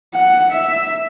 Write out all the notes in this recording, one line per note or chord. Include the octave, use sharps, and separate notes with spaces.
F#5
E5